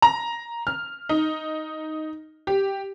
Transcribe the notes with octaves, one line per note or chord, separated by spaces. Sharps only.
A#5
F6
D#4
G4